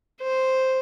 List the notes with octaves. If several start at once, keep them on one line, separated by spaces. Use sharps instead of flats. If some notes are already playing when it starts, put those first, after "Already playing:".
C5